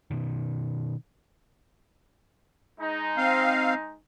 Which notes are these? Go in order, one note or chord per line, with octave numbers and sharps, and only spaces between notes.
B2 D#3
G#3 D#4
C4 F5